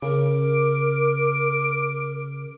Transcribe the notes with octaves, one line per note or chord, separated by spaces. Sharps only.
C#3 A#4 D6